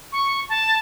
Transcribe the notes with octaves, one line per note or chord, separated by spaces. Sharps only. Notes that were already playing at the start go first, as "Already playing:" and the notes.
C#6
A5